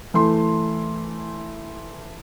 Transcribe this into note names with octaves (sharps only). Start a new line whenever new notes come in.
E3 A3 C6